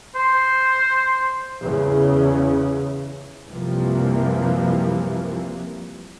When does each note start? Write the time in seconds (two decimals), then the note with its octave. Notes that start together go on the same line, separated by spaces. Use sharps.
0.15 C5
1.61 E2 C#3
3.48 C2 F#2 C3 E3 F3 A#3